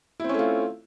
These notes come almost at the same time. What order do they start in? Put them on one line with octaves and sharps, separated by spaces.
E4 C4 C#4 A3 F4